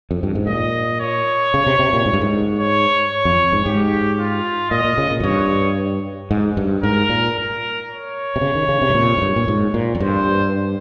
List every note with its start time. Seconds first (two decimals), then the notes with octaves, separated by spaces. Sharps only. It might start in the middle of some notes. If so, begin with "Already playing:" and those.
0.11 F2
0.23 G2
0.35 G#2
0.47 A#2 D#5
1.00 C#5
1.54 C#3
1.67 C3
1.79 C3
1.93 A#2
2.06 G#2
2.13 G2
2.21 G#2
2.59 C#5
3.12 C#5
3.25 F2
3.53 G#2
3.65 G#2 G4
4.19 F4
4.71 A#2 D#5
4.85 A#2
4.98 C#3
5.11 A#2
5.20 F2
5.24 G2 C#5
6.31 G#2
6.57 G2
6.83 G#2 A#4
7.09 A#2
7.36 A#4
7.89 C#5
8.36 C3
8.41 C#3
8.55 D#3
8.68 C#3
8.82 C3
8.90 G#2
8.95 A#2
9.18 G#2
9.22 G2
9.36 A#2
9.48 G#2
9.74 A#2
9.95 F2
10.00 G2 C5